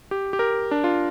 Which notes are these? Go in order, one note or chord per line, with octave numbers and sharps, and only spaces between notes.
G4
G4
A#4
D4
F4